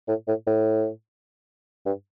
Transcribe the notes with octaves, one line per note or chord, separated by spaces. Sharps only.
A2
A2
A2
G2